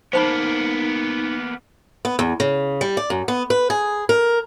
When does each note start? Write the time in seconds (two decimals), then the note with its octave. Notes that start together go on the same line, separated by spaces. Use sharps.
0.13 A#3 B3 D#4 C5 A5 B5
2.05 B3
2.19 E2
2.40 C#3
2.81 G3
2.97 D5
3.10 F#2
3.28 B3
3.50 B4
3.70 G#4
4.09 A#4